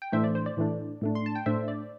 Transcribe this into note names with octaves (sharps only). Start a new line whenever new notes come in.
G5
A2 E3 A3 D4 C5 E5
D5
C5
D5
A2 E3 A3 D4
A2 A3 D4
C6
A5
G5
A2 A3 D4 C5 E5
D5